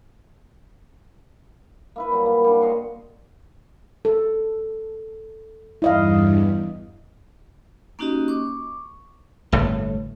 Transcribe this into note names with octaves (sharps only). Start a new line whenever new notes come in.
A#3 E4 B4
A#2 F#3 G3
A#3
G3 D4
C#5 D#5 C6 C#6
A4
E2 G2 E4 D#5 F5
A#3 C#4 D#4 F#4 G4 D#5
C#6 D6
G1 A2 A3